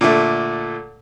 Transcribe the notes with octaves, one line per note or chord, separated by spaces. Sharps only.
A#2 D3 A3